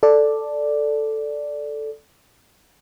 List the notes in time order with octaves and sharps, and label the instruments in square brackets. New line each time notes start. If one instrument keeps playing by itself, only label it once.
[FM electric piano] A4 D5